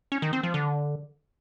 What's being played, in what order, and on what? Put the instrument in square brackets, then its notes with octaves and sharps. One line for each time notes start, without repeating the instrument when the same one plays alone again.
[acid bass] C#4
D#3
C4
F3
D3